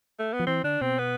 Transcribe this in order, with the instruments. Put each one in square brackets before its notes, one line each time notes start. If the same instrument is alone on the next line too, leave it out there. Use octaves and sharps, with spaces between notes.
[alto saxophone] A3
B3
[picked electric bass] F3
[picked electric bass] E3 [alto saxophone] C4
[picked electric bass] D3 [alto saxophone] D4
[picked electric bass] B2 [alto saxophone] C4
[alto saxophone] B3